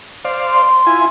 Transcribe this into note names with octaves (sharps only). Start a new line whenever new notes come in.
C5 D5 F5
C6
E4 F4 G#5